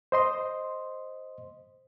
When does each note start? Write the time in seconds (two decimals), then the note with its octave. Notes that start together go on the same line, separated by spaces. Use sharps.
0.12 C5 D#5 C6